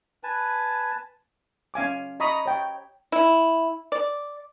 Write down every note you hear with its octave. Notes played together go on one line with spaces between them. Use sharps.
B4 G#5 A5
C#4 F5 G#5 D6
D#5 A#5 B5 C#6 D#6
C#5 G5
E4
D5